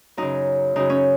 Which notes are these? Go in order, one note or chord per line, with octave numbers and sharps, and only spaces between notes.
F#2 C#3 D#4
F#2 C#3 D#4
C#4